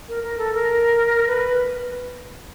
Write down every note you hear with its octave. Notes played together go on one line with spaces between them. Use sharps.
A#4
A#4
A4
A#4
B4